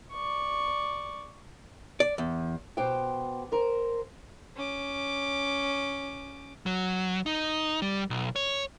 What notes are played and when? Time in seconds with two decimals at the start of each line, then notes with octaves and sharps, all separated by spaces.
0.13 D5 C#6
2.00 D5
2.18 E2
2.77 B2 G4 C5 G5
3.52 A#4 C5
4.56 C#4 D6
6.66 F#3
7.26 D#4
7.82 G3
8.10 B1
8.36 C#5